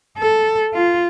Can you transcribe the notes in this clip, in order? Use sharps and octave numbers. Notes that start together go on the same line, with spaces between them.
A4
F4